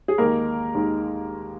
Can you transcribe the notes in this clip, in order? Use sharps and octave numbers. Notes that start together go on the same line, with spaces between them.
G#4
D#2 D#3 G#3 A#3 A#4
D#2 D#3 G#3